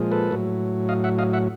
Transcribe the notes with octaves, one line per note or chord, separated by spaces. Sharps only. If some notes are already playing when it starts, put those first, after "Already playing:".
Already playing: A#2 F3 G#3
A4 B4
A2 F#3
D#5 F5
E5 F#5
D#5 F5
E5 F#5